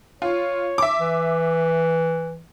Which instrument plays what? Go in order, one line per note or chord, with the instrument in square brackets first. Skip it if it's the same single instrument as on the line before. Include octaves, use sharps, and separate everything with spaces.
[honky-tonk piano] F4 [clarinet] C#5
[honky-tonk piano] E5 D6
[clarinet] E3